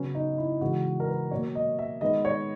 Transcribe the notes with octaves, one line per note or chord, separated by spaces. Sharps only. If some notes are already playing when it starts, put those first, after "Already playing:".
Already playing: C#3 F#3 B3 C#4
D#4
E4
C#3 E3 G#3 B3 F#4
A#4
B4
B2 F#3 A#3 C#5
D#5
E5
D#3 G#3 B3 D#5
C#5